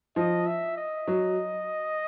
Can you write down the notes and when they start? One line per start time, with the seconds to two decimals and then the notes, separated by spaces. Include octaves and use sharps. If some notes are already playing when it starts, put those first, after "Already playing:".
0.16 F3 D#5
0.47 E5
0.77 D#5
1.07 F#3